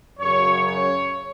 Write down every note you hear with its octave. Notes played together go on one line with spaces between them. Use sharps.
F#2 C#3 F#3 C#5
C#5